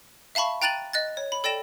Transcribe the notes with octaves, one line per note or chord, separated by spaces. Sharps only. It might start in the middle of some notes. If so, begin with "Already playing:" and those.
E5 F5 A5 B5 C#6
G5 A#5 F#6 A6 D#7 F#7
D#5 F#6 A6
C#5
B5
A4 D5 G5 A#6 E7